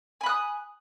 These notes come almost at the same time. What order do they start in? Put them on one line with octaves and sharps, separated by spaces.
G#5 B5 F#6 D#6